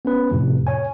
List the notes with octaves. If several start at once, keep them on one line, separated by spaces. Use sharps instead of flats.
B3 C#4 B4
F2 A2 C3
C#5 G#5